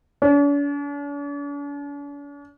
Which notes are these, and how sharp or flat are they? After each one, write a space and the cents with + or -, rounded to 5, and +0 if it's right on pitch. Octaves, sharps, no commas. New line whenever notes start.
D4 -45